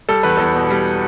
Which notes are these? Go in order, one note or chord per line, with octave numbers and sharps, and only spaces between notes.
G3 A4
E2 B4
E2 A4
B2
G3